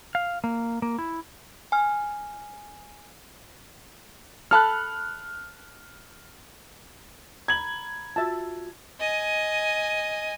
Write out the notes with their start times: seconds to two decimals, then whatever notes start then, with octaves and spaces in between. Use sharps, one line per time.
0.15 F5
0.44 A#3
0.82 A#3
0.98 E4
1.72 G#5 F6
4.51 A4 A5 B5 F6 F#6
7.48 A#5 B5 G#6 F#7
8.16 F4 F#4 E5 A5
9.00 D#5 G#5